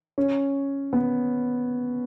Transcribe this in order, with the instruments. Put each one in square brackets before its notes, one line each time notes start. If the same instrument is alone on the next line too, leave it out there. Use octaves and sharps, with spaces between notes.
[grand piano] C#4
B3